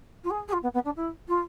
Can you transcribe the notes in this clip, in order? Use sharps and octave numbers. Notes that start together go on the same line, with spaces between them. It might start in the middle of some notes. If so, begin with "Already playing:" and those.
F4
G#4
G#4
F4
B3
B3
D4
E4
F4